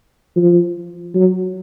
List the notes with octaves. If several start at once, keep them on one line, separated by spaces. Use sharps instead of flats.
F3
F#3